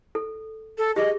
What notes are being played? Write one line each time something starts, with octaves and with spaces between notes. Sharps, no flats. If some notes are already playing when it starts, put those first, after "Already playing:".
A4
A4
G4 G#4 D#5